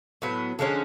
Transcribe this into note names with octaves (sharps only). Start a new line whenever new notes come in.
A2 F#3 B3
D3 F3 G#3 C#4